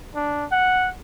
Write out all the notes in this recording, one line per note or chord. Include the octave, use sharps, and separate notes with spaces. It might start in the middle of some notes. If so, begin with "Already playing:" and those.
D4
F#5